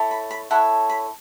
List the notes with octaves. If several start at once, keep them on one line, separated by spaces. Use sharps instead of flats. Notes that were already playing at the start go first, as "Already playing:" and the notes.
Already playing: E4 A4 C#5
B5
B5
E4 A4 C#5 F#5
B5